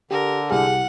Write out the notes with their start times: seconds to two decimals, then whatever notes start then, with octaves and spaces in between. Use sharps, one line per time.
0.11 D3 G4 A#4
0.51 C2 G4 G#4 F#5 F6